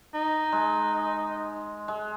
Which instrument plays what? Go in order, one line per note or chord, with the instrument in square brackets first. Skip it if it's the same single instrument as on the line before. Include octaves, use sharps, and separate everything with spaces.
[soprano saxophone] D#4
[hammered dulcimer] G#3
G#3